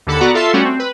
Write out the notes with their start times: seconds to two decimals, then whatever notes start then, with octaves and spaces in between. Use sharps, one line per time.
0.07 D#2 D3 A4 B5 C#7
0.20 B3 F#4 D5 F#5 A#5
0.34 F4 A4 E5 C6
0.53 G3 A3 C#4 F#4
0.65 C4
0.80 B4